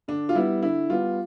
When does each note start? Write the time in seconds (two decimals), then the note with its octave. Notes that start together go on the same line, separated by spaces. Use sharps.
0.08 D3 D4
0.29 F4
0.35 G3 B3 E4
0.63 D3 E4
0.90 G3 B3 F4